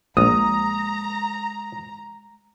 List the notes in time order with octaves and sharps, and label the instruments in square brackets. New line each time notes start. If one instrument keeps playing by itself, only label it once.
[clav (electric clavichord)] A#1 [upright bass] G#3 [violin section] A#5 [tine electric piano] D#6